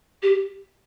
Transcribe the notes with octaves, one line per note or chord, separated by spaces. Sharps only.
G4